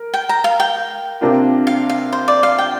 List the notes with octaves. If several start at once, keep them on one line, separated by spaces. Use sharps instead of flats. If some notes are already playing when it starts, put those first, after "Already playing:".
Already playing: A#4
G5
A#5
F5
G5
C3 A#3 D4 F4
F5
F5
C5
D5
F5
G5